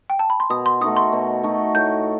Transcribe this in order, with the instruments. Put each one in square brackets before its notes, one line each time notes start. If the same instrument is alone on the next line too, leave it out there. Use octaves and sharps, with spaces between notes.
[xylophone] G5
A5
B5
C6
[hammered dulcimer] B2 [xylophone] D#6
[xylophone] C6
[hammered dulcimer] A3 D#4 F#4 [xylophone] D#6
[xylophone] C6
[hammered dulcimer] B2
A3 D#4 F#4
[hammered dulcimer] A2 [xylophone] G6